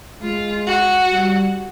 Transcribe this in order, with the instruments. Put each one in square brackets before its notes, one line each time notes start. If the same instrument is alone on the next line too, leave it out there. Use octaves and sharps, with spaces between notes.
[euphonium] G#3 [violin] F4
[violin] F#4
[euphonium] G3